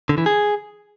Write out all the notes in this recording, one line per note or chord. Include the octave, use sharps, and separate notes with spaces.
D3
E3
G#4